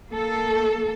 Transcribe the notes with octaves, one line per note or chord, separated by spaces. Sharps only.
A#3 A4